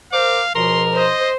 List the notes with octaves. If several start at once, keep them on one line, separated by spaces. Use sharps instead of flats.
A#4 C5 F5 D6
C#2 B2 F3 A#4 C6
C5 D#5